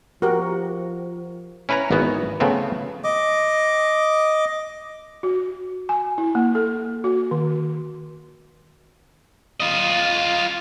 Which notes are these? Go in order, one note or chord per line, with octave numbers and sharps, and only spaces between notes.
F3 F#4 G4 A#4
C#4 E4 B4 C#5 A#5
G#1 E3 B3 F#4
C#3 F3 A3 B3 C4
D#5 D6
F#4
G#5
E4
A#3
A4
F#4
D#3
F4 D#5